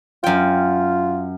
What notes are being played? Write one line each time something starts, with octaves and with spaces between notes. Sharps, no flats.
F#2 F4 G5